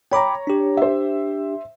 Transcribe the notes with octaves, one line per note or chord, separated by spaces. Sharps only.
C#5 G5 A#5 B5 D6
D4 G4
C5 E5